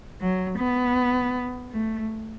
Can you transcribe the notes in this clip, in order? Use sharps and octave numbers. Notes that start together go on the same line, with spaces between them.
F#3
B3
A3